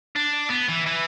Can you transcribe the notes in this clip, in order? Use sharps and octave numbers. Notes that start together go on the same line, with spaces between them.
D4
B3
E3
E3